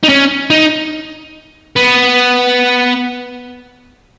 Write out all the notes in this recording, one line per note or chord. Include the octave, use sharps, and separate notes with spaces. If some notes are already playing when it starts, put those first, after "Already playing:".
D#4
C#4
D#4
B3